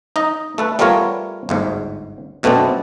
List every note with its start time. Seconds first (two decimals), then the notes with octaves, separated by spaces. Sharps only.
0.16 D#4 D#5
0.58 A3 A4 B4
0.79 G3 A3 B3 F4 A#4 C#5
1.49 G1 D2 G#2
2.43 F#2 B2 A3 B3 C4 D4